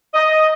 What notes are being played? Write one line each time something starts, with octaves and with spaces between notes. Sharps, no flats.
D#5